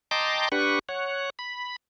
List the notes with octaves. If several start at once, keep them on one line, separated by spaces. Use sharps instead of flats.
D#5 G5 A5 A#5 C6 D6
D4 G4 B4 F#5 C#6
C#5 F#5
B5